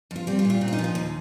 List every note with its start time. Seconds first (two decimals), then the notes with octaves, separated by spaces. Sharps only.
0.11 F2 F4
0.27 G3 C4
0.39 F4
0.45 A#2
0.50 F4
0.61 A#2 C4
0.68 F4
0.73 D#4
0.79 F3
0.84 D#4
0.95 D#2